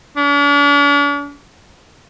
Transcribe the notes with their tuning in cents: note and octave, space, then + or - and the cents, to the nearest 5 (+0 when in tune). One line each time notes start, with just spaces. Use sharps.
D4 -45